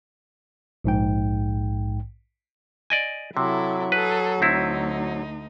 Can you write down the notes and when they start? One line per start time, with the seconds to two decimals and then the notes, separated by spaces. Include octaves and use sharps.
0.84 A#1 G#2 G5
2.90 D5 D#5 G#5
3.37 C3 F#3 E4 A4
3.92 G#4 A4 B4
4.42 D2 C4 D#4 E4